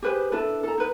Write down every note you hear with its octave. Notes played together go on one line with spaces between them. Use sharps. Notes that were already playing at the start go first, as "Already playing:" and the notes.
G4 G#4 B4 C5
D4 E4 A4 B4
A4 A#5
D#4 B4